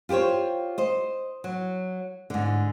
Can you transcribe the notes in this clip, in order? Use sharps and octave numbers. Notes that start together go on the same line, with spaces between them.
F4 G4 A4 C5 C#5
C5 D#5
F#3
G#2 D3